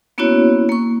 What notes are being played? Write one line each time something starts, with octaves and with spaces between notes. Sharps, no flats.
A#3 B3 C#4 E4 F#4 C#5
A#3 C#6